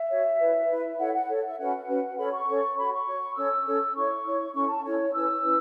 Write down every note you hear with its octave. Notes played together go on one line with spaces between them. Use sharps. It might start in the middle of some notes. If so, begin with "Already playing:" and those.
Already playing: E5
F#4 C#5
E4 B4
E4 B4
E4 A4 C#5 F#5
F#5
E4 A4 C#5
E5
C#4 F#4 B4 F#5
C#4 F#4 B4
C#4 A4 C#5 B5
C#6
C#4 A4 C#5
F#4 C#5 B5
C#6
F#4 C#5
C#4 A4 C#5 E6
C#4 A4 C#5
E4 C#5 C#6
E4 C#5
C#4 E4 A4 C#6
A5
C#4 E4 A4 C#5
C#4 E4 B4 E6
C#4 E4 B4